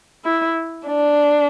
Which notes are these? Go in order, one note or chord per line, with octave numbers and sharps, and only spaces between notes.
E4
D4